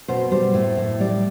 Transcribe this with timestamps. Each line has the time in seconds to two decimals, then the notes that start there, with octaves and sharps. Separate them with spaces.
0.08 B2 C5
0.31 G3 C5
0.54 A2
0.77 A2
1.00 G3 D5